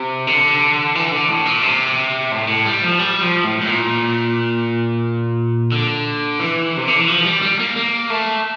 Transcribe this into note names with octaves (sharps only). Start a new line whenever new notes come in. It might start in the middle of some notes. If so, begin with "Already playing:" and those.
Already playing: C3
D3
E3
D3
A2
A#2
C3
A2
A2
G3
F3
G3
F3
A2
A2
A#2
D3
E3
C3
D3
E3
F3
G3
G3
A#3
A#3
A3